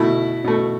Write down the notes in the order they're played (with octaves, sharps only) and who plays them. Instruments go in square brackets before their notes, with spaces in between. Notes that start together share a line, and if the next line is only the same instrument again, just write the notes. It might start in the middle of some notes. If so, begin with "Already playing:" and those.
Already playing: [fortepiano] B2 A3 E4
B2 A3